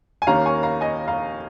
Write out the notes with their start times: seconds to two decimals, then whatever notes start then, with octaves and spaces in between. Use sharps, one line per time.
0.22 G#5
0.27 D#2 D#3 A#3 C#4 F5 A#5
0.46 G#5 C#6
0.63 F5 A#5
0.81 D#5 G#5
1.08 F5 A#5